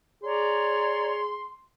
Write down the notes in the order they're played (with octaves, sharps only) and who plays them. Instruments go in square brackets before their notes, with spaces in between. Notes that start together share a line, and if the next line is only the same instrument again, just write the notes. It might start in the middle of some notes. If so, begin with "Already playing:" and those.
[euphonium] G#4 [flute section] C#5 D5 A#5 [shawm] C6